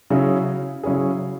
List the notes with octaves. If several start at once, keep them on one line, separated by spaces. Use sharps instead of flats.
C#3 F#3 C#4 E4 G#4
C#3 F#3 C#4 E4 G#4